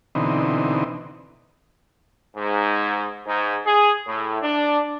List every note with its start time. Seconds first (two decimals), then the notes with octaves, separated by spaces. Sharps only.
0.15 B2 D3 E3 C4 D#4
2.36 G#2
3.27 G#2
3.66 G#4
4.07 A2
4.42 D4